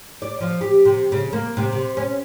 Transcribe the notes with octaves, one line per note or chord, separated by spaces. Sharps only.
D5
F3
G4
C3
C#3
A#3
C3
C3
C#4